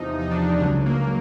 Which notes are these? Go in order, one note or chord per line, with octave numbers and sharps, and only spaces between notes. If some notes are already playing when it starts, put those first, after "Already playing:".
Already playing: E2 C3 F3 D#4
D#4
D4
D#4
C#2 C#3 F#3 D4
A#3